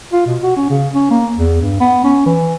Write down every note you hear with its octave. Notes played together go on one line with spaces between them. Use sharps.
F4
B2
F#4
C#4
C#3
C#4
A#3
E2
G2
B3
C#4
E3